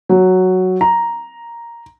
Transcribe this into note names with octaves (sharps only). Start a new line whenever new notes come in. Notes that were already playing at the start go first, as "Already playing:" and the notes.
F#3
A#5